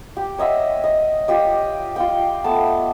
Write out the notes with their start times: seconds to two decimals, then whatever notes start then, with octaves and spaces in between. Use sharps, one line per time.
0.17 G4
0.38 C#5 D#5 E5 F#5
0.84 D#5
1.28 F4 G4 D#5
1.96 F4 F5 G5
2.44 A3 B3 A5